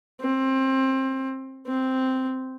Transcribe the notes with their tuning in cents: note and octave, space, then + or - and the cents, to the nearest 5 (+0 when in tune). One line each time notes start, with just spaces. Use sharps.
C4 +25
C4 -5